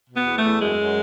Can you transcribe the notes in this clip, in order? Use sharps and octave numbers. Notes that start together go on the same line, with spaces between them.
B2
B3
E2
A3
E2
F#2 G#3
F#2